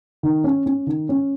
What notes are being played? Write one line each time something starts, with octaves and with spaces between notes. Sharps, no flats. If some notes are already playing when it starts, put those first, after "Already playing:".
D#3
C#4
C#4
D#3
C#4